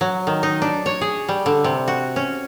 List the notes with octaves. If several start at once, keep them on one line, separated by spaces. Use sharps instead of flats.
F#3
D#3
D#4
D4
C#5
G#4
G3
D3
C3
F#4
C#4